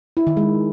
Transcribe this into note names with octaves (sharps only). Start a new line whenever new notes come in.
E4
D#3
G#3